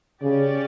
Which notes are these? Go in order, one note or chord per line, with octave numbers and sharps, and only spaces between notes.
C#3 C#4 G4 D5